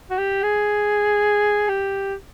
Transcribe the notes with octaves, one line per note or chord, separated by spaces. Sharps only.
F#4
G4
G#4
G4